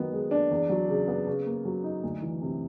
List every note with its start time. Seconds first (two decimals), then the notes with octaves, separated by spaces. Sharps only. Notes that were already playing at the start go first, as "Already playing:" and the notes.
Already playing: D#3 F#3 B3
0.12 G#3
0.31 D4
0.51 E2
0.69 F#3
0.88 C#3
1.08 B3
1.27 C#3
1.46 A#3
1.65 F#3
1.84 D#4
2.03 D2
2.22 E3
2.41 C3